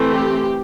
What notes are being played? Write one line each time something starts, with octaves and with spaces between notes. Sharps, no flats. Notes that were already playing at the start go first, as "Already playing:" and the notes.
Already playing: E3 A3 C4
G4